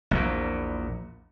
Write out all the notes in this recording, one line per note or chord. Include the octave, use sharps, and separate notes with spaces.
A#1 E2 A#2